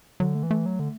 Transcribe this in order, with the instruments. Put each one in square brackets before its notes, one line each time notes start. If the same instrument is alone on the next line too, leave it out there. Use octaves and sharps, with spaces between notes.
[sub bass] D3 [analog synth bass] F#3
[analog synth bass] A3
[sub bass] E3
[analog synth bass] A3
[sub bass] F#3
D3